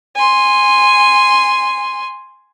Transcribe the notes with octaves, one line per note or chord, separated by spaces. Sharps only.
G#5 C6